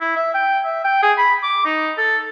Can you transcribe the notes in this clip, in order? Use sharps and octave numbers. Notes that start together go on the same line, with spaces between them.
E4
E5
G5
E5
G5
G#4
B5
D6
D#4
A4